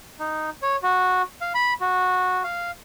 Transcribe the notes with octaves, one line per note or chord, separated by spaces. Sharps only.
D#4
C#5
F#4
F5
B5
F#4
F5